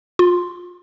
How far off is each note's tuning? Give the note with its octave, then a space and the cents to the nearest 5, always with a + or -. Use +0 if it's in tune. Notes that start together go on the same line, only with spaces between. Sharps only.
F4 +30 C6 +0